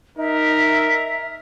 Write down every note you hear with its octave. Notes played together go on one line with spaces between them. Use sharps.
D#4 A#4 E5